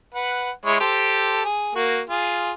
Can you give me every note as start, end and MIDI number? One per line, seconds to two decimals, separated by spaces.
0.14 0.51 71
0.14 0.51 78
0.65 0.79 56
0.65 0.79 64
0.65 0.79 73
0.80 1.42 67
0.80 1.42 69
0.80 1.42 72
1.45 1.74 68
1.75 2.00 58
1.75 2.00 66
2.09 2.52 65
2.09 2.52 68